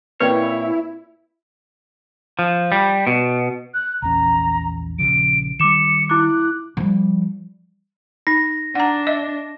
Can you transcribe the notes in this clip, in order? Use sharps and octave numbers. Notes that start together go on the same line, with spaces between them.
A#2 A#3 C4 E4 B4 C#5 D5 G5
F3
G3
B2
F#6
A#1 E2 C#4 A#5
A#1 C#3 F3 D7
D#3 G3 D6 C#7 E7
E4 D6 F#6
F3 G3
D#4 A#6
D4 F#5 A#5
D#5 E5